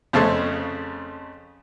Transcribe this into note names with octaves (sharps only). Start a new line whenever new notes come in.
F2 C#3 A3 C5 A5 C#6